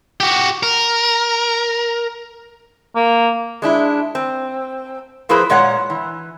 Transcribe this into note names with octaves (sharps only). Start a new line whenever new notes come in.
F#4 G4
A#4
A#3
G#3 D4 E4
C4
F3 A#3 E4 G#4 B4 C5
A#2 G#3 C#5 F#5
E3